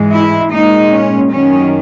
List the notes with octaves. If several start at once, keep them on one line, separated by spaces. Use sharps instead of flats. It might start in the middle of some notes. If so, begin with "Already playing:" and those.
Already playing: G#2 E3 G#3
E4
A#2 G#3 D#4
C#4
F#2 D#3 F#3 C#4